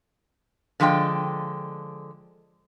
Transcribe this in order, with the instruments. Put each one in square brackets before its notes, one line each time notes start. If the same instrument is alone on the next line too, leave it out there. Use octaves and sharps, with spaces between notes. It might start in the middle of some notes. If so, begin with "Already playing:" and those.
[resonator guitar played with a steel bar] D3 F3 G#3 D#5 G5